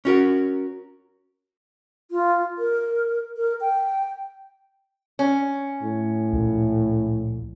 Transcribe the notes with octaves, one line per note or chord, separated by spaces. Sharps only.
C#4 F#4 A#4
F4
A#4
A#4
G5
C#4
A2
C#2 A#2 F3